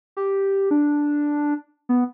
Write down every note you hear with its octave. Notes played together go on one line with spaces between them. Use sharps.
G4
D4
B3